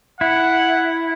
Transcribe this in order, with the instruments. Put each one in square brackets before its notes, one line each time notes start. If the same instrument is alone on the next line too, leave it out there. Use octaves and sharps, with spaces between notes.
[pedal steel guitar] E4 [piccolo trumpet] F#5